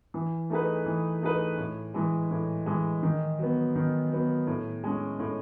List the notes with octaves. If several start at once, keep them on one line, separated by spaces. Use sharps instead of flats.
E3
A3 D#4 G#4 B4
E3
A3 D#4 G#4 B4
A2
E3 G#3
A2
E3 G#3
D#3
F#3 B3
D#3
F#3 B3
A2
G#3 C#4
A2